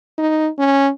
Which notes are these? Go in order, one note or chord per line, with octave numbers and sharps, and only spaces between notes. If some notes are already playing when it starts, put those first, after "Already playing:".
D#4
C#4